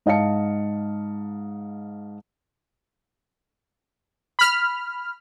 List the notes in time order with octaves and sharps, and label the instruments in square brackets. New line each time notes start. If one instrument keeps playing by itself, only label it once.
[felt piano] G#2 D#5 F5 A5 C#7
[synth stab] B5 F6